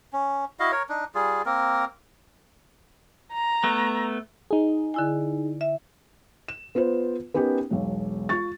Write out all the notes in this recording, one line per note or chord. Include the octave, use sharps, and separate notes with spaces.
C#4
E4 F#4 D#5 F5
A#4 C#5
D4 D#4
G3 F4 G#4
A#3 C4 A#4
A#5
A3 B3
D#4 G#4
D3 E4 G#5
E5
E7
B3 F4 B4 C5
B3 C#4 D#4 G4 A#4
E1 B1
F4 C#6 A6